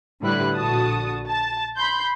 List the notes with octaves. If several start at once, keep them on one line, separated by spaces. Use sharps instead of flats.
A2 D3 G3 E4 B4 F#6
A#1 D3 F#4 A5 D#6
A5
B5 C6 G6